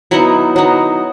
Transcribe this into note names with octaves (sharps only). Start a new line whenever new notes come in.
F#3 B3 D#4 E4
F#3 B3 D#4